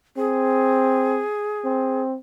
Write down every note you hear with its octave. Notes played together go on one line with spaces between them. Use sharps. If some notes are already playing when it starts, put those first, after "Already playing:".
C4 G#4
C4